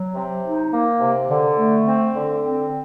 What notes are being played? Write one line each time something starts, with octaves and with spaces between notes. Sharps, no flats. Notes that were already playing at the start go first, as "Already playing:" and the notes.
Already playing: F#3
C3
D#4
A#3
C3
D3
A3
C4
D3
C4